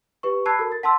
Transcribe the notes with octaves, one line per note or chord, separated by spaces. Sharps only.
G4 B4 C#6
A5 B5 E6 F#6 G#6 C7
F#4 A4 A#4
A6
F#5 A5 C6 E6